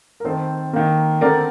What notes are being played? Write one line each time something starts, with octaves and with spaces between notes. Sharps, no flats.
A#4
D#3 A3 C4 A4 C5
D#3 A#3
D3 A3 C4 A#4 D5